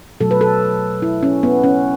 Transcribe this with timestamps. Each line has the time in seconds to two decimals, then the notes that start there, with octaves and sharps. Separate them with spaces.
0.20 B2 F#3 A3 A4
0.31 B4
0.41 A4
1.02 E4
1.23 C#4
1.43 B3
1.64 C#4